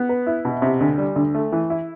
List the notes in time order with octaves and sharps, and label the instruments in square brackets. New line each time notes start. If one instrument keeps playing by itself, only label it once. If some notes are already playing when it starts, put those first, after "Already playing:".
Already playing: [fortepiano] B3
B4
E4
B2
C3
D2
G3
D2
A3
E3
E4